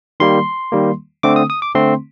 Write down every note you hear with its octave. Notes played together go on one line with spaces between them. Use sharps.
D#3 G3 A#3 C6
D#3 G3 A#3
D3 A3 C4 D6
D#6
D#6
D6
D3 A3 C4 C6